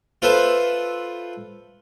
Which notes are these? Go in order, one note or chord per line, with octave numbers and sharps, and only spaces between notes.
F4 A4 B4 C5 E5